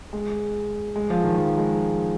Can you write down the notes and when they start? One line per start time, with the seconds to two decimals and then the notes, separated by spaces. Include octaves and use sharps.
0.13 G#3
0.96 G#3
1.10 F3
1.24 D#3
1.37 F3
1.58 G#3